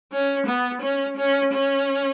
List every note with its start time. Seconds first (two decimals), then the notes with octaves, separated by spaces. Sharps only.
0.12 C#4
0.46 B3
0.82 C#4
1.17 C#4
1.53 C#4